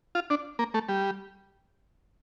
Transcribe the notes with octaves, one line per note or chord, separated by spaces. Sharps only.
F4
D4
A#3
A3
G3